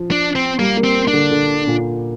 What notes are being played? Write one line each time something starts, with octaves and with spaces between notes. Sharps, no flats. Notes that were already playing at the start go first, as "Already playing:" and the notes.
Already playing: F3
D4
C4
G3 A#3
A#3
C4
D4
D3
D3
A#2